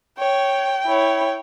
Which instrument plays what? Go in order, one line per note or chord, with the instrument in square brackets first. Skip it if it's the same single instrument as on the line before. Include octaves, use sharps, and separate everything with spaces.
[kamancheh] C#5 [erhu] G5
[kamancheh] E4 C#5